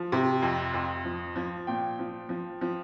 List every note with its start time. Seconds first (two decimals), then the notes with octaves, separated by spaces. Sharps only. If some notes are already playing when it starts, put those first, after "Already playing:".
Already playing: F3
0.12 C3
0.42 F2
0.73 F2
1.05 F3
1.36 F3
1.67 A#2 G5
1.99 F3
2.29 F3
2.61 F3